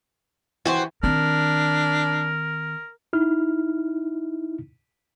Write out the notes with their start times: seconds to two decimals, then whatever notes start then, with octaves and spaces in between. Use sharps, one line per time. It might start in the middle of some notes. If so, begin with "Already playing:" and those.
0.65 E3 F#4 G4 C5
1.03 D#3 C4 D4 A#4
3.13 D#4 E4 F6